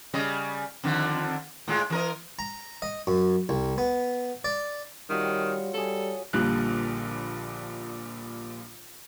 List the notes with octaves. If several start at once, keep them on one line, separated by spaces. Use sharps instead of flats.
C#3 G3 D#5
F2 D3 D#3
A2 G#3 F4
E3 A#4 D#5
A#5
D#5
F#2
C2
B3
D5
D#3 G3 F4 F#4 C#5
G3 G#4 A4 C#5
A#1 A#2 D3 G3 A#3 F#6